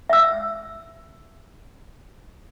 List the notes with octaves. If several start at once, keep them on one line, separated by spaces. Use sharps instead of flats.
E5 E6